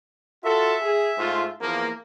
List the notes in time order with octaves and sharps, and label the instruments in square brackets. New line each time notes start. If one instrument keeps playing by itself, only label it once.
[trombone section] F4 F#4 A4 [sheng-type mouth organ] E5
[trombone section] G#4
G#2 A3 F4
E2 F3 A#3